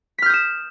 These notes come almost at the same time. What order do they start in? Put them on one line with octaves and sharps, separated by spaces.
B6 F6 G6 D#6 E7